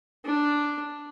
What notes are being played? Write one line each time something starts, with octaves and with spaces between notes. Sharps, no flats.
D4